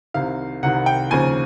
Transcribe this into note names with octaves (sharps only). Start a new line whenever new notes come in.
C2 C3 D#3 F5
C2 C3 D#3 F#5
G5
D#2 C#3 F3 G#5